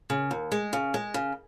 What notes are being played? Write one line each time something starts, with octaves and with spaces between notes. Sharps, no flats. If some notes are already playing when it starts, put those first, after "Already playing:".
C#3
D#2
G#3
C#3
G#3
C#3